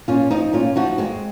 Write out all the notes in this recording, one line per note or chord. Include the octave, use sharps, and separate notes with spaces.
A#2 C#4 F4
F3 C4 D#4
A#2 C#4 F4
F3 D#4 F#4
D#2 G#3 C4